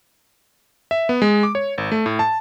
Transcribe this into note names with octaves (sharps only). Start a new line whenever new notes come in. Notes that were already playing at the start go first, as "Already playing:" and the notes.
E5
B3
G#3
D6
C#5
G#1
A3
A2
A5